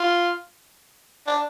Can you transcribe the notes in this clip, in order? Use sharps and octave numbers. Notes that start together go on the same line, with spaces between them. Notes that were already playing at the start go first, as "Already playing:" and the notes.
Already playing: F4
D4